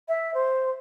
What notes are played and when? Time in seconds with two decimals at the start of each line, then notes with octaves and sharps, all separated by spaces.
0.08 E5
0.34 C5